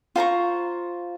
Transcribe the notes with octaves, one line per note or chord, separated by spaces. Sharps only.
F4 C5 A#5 C#6